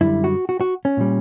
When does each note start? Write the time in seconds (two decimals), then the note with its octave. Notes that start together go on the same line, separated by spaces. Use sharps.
0.01 F#2 D3 G3 E4
0.24 F#4
0.49 F#4
0.61 F#4
0.85 C#4
0.97 A#2 G3